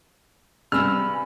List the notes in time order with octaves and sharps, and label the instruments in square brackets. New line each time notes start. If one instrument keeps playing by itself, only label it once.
[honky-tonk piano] G2 C3 [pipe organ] G#5 B5 [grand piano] E6 F6